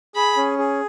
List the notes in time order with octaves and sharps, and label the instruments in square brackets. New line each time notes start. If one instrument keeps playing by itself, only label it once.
[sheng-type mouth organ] G#4 [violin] B5
[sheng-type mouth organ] C#4
G#4